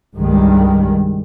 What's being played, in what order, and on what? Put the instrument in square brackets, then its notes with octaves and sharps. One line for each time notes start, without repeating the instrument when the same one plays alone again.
[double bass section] C2 G2 D#3 G3 G#3